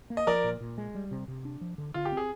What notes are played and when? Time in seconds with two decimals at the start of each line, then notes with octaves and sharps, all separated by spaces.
0.10 A#3
0.17 D#5
0.27 F3 A#4 D5
0.44 A#2
0.61 A#2
0.78 G#3
0.95 G3
1.11 C3
1.28 C3
1.45 D4
1.61 F3
1.78 D3
1.94 D3 F4
2.05 G4
2.12 C4
2.17 G#4